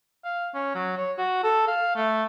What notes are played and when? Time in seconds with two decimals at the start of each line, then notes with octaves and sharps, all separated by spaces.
0.24 F5
0.55 C#4
0.75 F#3
0.98 C#5
1.18 F#4
1.44 A4
1.67 F5
1.96 A3